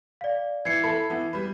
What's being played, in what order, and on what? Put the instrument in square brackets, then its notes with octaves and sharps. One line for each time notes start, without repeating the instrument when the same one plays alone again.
[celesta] D5 F5
[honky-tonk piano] E3 [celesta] G#6 C7 C#7
[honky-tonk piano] E4 A4 B5
E3 B3
G3 B4